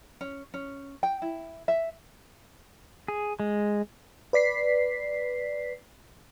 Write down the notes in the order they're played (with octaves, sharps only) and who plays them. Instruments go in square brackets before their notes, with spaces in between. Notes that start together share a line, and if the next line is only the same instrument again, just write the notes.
[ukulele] C#4
C#4
G5
E4
E5
[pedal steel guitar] G#4
G#3
[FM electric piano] B4 D5 B6 C7